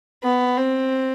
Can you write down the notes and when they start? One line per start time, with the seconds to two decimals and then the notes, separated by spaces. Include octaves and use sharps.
0.23 B3
0.57 C4